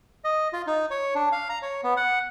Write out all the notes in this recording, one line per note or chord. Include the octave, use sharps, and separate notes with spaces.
D#5
F4
D#4
C#5
D4
F5
A#5
C#5
B3
F#5